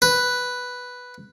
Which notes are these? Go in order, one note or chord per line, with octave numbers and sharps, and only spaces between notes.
B4